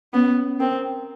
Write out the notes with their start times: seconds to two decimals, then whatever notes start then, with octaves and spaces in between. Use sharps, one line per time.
0.13 B3 C#4
0.60 C4 A#4